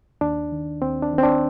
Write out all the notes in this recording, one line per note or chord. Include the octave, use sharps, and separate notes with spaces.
D#2 D4
D#3
D#2 C4
D4
D#3
C4
D4